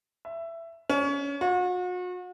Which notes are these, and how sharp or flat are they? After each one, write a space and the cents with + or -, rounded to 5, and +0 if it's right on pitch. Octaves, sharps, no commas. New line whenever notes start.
E5 +15
C#4 +25
F#4 -40